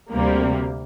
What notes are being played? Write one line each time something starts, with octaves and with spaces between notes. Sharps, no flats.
D2 C3 G3 A#3